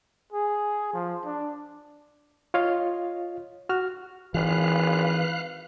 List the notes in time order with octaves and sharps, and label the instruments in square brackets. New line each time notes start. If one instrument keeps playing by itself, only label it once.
[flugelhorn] G#4
F3
D4
[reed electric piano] F4 C#5 D#5 F5
F#4 F6
[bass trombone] G#1 [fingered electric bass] E3 [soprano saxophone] B4 [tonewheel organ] F5 F#6